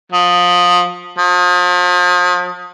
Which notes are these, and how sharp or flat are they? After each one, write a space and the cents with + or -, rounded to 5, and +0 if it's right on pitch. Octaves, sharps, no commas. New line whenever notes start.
F3 +25
F3 +40